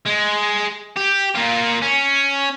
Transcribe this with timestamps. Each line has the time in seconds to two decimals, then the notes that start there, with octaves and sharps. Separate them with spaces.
0.05 G#3
0.97 G4
1.35 A#3 F4
1.82 C#4